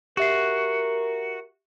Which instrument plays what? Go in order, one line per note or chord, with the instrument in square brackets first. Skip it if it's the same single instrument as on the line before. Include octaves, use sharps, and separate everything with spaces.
[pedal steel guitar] F#4 [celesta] G4 E5 C7 [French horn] A#4